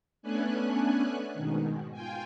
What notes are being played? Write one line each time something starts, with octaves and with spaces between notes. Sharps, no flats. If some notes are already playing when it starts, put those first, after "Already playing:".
A3 B3 C#4 D4 G#5 F#6
G#2 B2 D#3
F4 G5 G#5